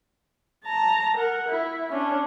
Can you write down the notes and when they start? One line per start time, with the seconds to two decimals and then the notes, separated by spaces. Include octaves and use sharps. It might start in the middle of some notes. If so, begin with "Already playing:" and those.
0.65 A5 A#5
1.17 A#4 F#5
1.49 E4
1.93 C#4 D4